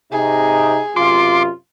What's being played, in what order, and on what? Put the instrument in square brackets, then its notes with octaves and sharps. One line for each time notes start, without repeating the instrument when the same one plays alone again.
[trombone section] C3 D#4 [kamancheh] G#4
[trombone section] F#2 C3 F4 [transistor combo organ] C6 D6